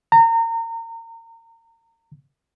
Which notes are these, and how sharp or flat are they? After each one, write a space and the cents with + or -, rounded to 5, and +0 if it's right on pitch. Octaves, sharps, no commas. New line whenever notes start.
A#5 -30